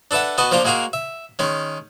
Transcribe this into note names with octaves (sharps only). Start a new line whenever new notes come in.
D4 A4 B4 E5 F#5
B3 F#4 D#5 A5
F3 A#3 D4 F4
G#3 A#3 F#4 G#4 A#4
E5
D#3 G#3 C#4